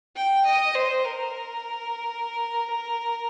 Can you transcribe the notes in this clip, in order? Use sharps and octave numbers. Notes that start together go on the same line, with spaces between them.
G5
D#5
C5
A#4